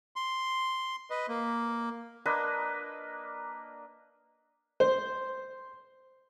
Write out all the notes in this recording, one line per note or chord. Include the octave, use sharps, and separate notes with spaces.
C6
B4 D#5
A#3
A#3 D4 B4 D#5
C5